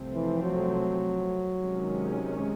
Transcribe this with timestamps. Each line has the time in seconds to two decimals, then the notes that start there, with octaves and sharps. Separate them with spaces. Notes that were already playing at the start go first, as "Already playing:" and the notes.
Already playing: C2 C3 F3 A3 C4
0.14 E3
0.43 F#3
1.58 C3 D#3 G#3 C#4